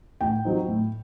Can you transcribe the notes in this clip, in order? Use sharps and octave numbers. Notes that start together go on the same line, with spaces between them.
A2 G5
F#3 C4 D#4
A2